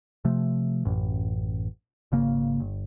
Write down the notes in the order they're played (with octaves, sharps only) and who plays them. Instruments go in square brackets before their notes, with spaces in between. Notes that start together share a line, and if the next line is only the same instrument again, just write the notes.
[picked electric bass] C3 F3 A3
A1 F#2
G#1 C#3 A#3
G1